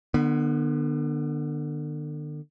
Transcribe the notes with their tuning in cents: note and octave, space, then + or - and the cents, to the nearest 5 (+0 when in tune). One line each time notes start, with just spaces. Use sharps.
D3 +40 B3 -15